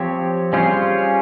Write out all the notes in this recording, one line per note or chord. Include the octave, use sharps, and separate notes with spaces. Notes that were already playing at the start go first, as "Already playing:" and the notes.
Already playing: F3 C4 G4 C#5
G3 C#4 F4 G#4 C5